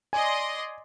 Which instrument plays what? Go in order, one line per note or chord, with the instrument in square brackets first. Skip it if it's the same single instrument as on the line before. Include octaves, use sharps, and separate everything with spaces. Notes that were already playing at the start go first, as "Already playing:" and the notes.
[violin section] D5 D#5 C6 [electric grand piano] G#5